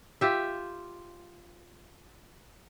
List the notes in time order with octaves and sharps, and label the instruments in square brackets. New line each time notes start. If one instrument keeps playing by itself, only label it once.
[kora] F4 G4 E5